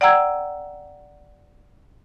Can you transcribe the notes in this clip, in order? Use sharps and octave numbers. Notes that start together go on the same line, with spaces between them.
D5 F#5 G5 A#5 E6 G#6